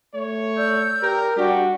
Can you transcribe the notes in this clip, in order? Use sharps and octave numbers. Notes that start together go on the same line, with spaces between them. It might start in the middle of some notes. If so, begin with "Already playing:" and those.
A3 C#5
D5 E6 G6
G4 A#4
G3 D4 F#4 G4